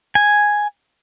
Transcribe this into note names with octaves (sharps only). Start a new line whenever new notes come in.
G#5